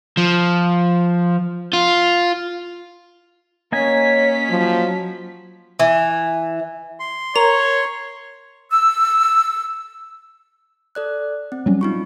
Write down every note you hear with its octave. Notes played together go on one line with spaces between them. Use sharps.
F3
F4
A#3 C#4 C#5 D#5 G#5 B6
F3 F#3
E3
C6
A#4 C#5 A#5
E6
A4 D5 F#6
C4
F#3 G3 C#4
D#4 F4 C#6